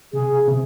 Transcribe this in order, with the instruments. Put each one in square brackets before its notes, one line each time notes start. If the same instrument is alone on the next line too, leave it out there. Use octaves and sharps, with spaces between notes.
[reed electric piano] C3 [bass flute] G#4
[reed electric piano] C3